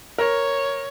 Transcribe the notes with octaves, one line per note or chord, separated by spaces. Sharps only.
A#4 C#5